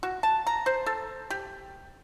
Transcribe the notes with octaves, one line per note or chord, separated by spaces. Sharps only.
F#4
A5
A#5
C5
A4
G4